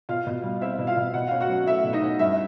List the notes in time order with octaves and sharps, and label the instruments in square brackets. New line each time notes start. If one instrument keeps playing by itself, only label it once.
[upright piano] B2 F4 F5
B2
G3
C4 E4 E5
B2
F4 F5
B2
B2 F#5
C#4 F5
F#4 F#5
F#3
A3 E4 E5
B2
D#4 D#5
C#4
G2 E4 E5